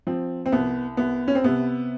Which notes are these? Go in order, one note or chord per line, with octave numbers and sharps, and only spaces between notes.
F3 C4
C4
C2 B3
C2 B3
C#4
C4
C3 B3